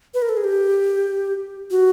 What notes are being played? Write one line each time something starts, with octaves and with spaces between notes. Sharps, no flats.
B4
A#4
A4
G#4
G4
F#4